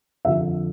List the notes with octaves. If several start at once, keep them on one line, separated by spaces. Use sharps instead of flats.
F2 D3 F3 E5